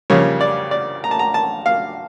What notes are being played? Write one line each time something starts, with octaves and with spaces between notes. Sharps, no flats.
F2 C#3 G3 A#3 C#5
D5
D5
A#5
A5
A#5
A5
F5